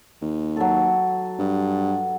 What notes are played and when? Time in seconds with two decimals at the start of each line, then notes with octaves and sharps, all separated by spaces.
0.21 D#2
0.56 F#3 A4
1.39 G2